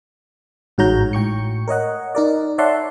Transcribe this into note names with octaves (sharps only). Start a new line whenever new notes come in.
A1 G#2 F#4 C#5 A#5 G6
A2 G5 C#6 C#7
A#4 C#5 D#5 F#5
D#4 A#4 D5
C#5 D5 E5 F#5 A5 C6